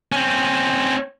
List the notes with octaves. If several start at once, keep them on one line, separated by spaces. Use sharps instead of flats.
C4 C#4